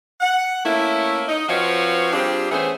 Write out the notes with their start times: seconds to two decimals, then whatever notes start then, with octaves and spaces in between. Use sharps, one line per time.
0.20 F#5
0.64 A3 A#3 C#4 E4
1.28 D#4 D#5
1.48 F3 C4 F#4 B4 C#5 F5
2.13 G3 C4 D4 F4 G4 G#4
2.51 E3 A3 B3 C#4 G#4 C5